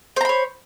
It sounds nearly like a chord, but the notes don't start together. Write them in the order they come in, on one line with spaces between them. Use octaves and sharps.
C5 A#5 B5 C#5